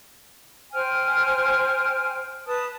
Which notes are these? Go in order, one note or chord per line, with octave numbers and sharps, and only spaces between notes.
C5 G5 G#5 F6
B4 A5 D#6